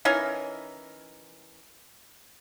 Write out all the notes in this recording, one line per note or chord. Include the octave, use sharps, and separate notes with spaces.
E3 C#4 D#4 A#4